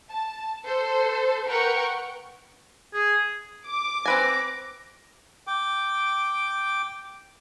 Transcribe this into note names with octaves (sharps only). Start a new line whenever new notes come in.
A5
A4 C5
A#4 B4 F#5 G5 C#6
G#4
D6
C4 B4 G#5 A#6
G5 D6